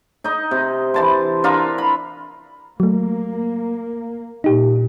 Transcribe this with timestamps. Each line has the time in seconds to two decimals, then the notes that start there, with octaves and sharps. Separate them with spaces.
0.24 D#4 D#5
0.51 C3
0.94 E3 A5 C6
1.44 D4 F4 A#4 E5
1.78 B5
2.80 F#3 A3 A#3
4.44 A#2 D#4 G4